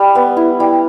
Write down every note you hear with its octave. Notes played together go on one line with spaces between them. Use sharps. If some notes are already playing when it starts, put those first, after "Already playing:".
Already playing: G3
B3
E4
G3